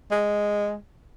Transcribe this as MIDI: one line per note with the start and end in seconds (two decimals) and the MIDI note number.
0.11 0.76 56